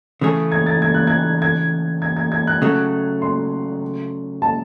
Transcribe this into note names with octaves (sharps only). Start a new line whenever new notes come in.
C#3 E3 A3 C#4 G#4
G#6
A6
G#6
F#6
G#6
G#6
G#6
G#6
G#6
F#6
C#3 F#3 A3
C6
A5